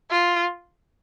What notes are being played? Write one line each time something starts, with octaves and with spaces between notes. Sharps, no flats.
F4